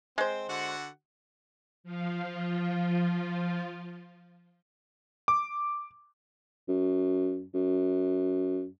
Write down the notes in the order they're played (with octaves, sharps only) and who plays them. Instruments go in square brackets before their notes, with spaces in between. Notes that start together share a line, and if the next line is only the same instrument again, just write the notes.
[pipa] G#3 C5 [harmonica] C4
[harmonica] D3 F#4 F#5
[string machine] F3 F4
[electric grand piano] D6
[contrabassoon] F#2
F#2